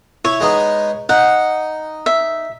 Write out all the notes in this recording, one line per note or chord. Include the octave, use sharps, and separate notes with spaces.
E4 C#5
G#3 B3 D#4
D#4 F#5
E5